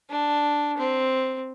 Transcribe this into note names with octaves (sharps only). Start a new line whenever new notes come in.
D4
C4